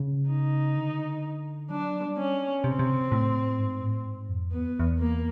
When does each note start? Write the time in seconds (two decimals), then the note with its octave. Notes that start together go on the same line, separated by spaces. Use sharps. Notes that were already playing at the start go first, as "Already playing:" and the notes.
Already playing: C#3
0.30 D#4
0.76 D3
1.70 F#3 D4
2.02 G3
2.18 C#4
2.64 C3 C4
2.72 C#3
2.79 C3
3.12 A2
3.59 G#2
3.81 A2
4.05 G#2
4.29 F2
4.52 E2 B3
4.79 E2
4.99 A#3